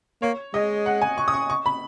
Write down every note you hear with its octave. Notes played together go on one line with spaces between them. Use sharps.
A#3 C#5
G#3 D#5
F#5
G#5
C#6
D#6
C#6
C#6
B5